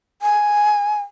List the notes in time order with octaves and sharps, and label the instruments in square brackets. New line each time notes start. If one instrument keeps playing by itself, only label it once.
[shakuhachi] G#5